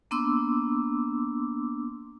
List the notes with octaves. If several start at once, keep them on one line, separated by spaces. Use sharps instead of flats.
A#3 B3 D4 C6 D6 E6